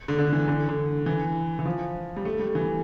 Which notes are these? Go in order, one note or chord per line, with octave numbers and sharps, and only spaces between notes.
D3
D3
E3
D3
D3
E3
E3
F3
G3
A3
G3
E3